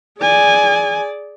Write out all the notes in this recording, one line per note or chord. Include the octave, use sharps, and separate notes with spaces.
G#4 D5 G#5